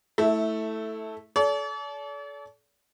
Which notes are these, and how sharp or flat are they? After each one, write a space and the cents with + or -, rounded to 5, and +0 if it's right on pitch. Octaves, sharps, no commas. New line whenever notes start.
A3 +0 E4 -15
A4 -30 D5 -45